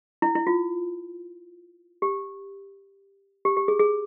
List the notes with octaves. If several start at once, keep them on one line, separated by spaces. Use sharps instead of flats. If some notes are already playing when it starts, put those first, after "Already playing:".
E4
E4
F4
G4
G4
G4
G#4
G#4